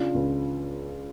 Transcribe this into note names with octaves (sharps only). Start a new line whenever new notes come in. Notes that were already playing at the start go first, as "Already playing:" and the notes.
Already playing: C#3 D4 F4
C#2